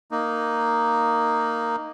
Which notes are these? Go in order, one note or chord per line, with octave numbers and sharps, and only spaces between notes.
A#3 D#4